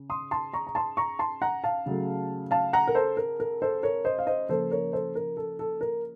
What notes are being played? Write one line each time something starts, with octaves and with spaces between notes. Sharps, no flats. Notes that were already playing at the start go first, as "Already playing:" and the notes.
Already playing: C#3
C6 D#6
A5 C6
A#5 C#6
A#5
A5 C6
A#5 C#6
A5 C6
F#5 A#5
F5 A5
C#3 F#3 A3
F5 A5
F#5 A#5
A#4
A4 C5
A#4
A#4
A4 C5
A#4 C#5
C5 D#5
F5
C5 D#5
C#3 F3 A#3 A4 C5
A#4 C#5
A4 C5
A#4
A4
A4
A#4